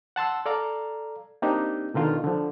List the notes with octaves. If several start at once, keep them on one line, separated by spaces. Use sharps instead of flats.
F#5 A5 C6 E6
A4 D5 F5 A#5
A#3 C4 D4 D#4 G4
B2 D3 D#3 F4
D3 F3